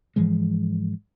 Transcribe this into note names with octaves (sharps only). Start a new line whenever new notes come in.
G#2 E3 F3 G#3